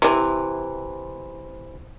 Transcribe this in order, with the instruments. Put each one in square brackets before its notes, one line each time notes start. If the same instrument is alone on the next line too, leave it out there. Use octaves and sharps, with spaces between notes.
[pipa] C3 E3